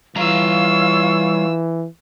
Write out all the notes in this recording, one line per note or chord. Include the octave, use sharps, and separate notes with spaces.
E3 G3 F4 C#5 F5 A#5 C#6 E6